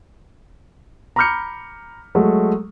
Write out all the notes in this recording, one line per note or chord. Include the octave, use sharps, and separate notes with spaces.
A#5 B5 D6 F6 G6 C#7
F#3 G#3 A3